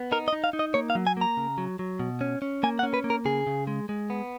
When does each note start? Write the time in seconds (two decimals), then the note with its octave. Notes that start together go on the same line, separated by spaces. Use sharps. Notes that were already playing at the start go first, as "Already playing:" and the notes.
Already playing: B3
0.12 D#4 A#4
0.28 D#5
0.33 D#4
0.44 F5
0.53 D#4
0.59 D#5
0.74 A#3 C#5
0.90 F5
0.95 F#3
1.07 G#5
1.17 A#3 A#5
1.37 C#3
1.58 F#3
1.79 F#3
2.00 B2
2.21 C#4
2.42 C#4
2.63 A#3 G#5
2.79 F#5
2.83 C#4
2.94 B4
3.04 A#3
3.10 A#4
3.25 C#3 G#4
3.47 C#3
3.67 G#3
3.89 G#3
4.10 B3